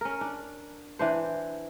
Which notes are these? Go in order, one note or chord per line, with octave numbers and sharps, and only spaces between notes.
C#4 A#4
D4
E3 D4 C5